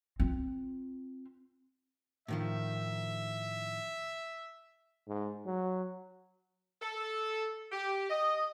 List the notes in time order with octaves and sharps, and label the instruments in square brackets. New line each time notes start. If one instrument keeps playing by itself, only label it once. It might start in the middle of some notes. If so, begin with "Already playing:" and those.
[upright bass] C4 F4
[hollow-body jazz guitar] A2 D#3 F3 [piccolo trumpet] E5
[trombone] G#2
F#3
[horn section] A4
G4
D#5